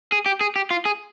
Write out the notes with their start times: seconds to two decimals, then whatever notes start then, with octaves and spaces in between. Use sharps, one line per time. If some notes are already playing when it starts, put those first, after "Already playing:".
0.12 G#4
0.26 G4
0.41 G#4
0.56 G4
0.71 F4
0.85 G#4